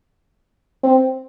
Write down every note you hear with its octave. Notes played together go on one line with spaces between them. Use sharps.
C4